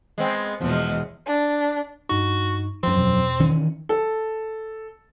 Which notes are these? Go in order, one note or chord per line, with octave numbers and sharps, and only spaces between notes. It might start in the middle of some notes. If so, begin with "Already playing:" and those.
G#3 B3 C4
E2 B2 F3 G#3
D4
G2 D#4 F#4
F#2 F3 C4
E2 B2
D#3 E3 C#4
A4